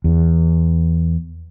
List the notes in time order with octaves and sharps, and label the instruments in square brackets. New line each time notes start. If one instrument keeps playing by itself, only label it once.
[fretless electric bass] E2